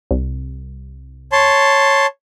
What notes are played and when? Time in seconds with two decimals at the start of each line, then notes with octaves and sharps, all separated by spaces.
0.11 C2
1.32 C#5 A5 C6